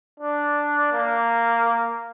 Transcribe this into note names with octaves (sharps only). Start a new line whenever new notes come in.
D4
A#3